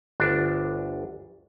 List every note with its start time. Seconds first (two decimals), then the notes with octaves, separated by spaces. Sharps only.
0.20 G1 D2 D4